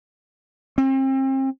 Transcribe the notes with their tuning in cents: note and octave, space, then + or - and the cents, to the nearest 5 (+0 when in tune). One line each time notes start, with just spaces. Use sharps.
C4 +35